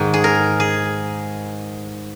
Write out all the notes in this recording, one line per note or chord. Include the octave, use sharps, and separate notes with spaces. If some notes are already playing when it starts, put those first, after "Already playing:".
Already playing: G#2 D#3
G#4
A#4
G#4